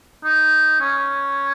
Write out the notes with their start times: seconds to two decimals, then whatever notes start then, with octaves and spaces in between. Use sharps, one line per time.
0.24 D#4
0.81 C#4